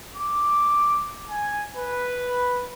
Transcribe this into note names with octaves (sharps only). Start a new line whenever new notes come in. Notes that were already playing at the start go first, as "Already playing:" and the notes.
D6
G#5
B4